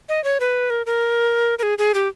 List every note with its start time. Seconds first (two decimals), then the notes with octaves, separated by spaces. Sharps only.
0.09 D#5
0.24 C#5
0.40 B4
0.70 A#4
0.86 A#4
1.59 A#4
1.63 G#4
1.78 G#4
1.94 G4